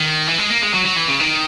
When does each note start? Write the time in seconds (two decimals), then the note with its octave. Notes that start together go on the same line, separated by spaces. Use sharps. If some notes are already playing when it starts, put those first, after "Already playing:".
Already playing: D#3
0.28 E3
0.39 G#3
0.50 A#3
0.62 G#3
0.74 F#3
0.85 F#3
0.96 E3
1.08 C#3
1.20 D#3